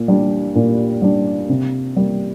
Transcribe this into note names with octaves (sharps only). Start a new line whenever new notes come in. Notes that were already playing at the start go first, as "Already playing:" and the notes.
Already playing: A#2
G3 D4
A#2
G3 D4
C3
G3 A#3